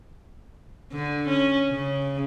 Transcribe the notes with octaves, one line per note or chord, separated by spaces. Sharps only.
D3
C#4
C#3